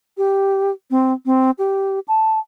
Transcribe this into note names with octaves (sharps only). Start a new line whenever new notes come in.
G4
C4
C4
G4
A5